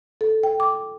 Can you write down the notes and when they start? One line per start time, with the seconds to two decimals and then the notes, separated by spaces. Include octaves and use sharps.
0.21 A4
0.43 G5
0.60 D6